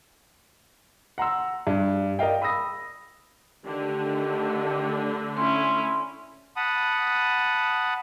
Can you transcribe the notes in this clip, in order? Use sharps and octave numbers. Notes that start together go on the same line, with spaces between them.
F#5 A#5 C6 E6
G2
A#4 D5 D#5 F5 G5
B5 D#6 E6 A#6
D3 D#3 A3 G4
C#4 E4 C6
F#5 A5 B5 D#6